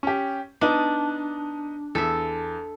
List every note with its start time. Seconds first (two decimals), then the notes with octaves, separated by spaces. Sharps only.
0.03 C#4 G4
0.61 B3 D4 D#4
1.95 E2 A4 E5